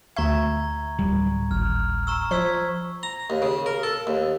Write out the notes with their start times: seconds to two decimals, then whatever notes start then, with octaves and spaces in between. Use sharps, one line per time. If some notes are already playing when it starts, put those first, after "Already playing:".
0.16 D2 E5 A#5 C#6 G#6
0.99 D1 G3
1.51 G#1 F6
2.07 A#5 C#6 E6
2.31 F3 C5 C#6 E6 G#6 B6
3.03 A#5
3.30 D#2
3.42 C#3
3.66 A#4
3.83 A4
4.07 D#2